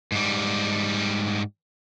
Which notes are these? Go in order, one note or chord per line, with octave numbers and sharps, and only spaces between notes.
G#2 G3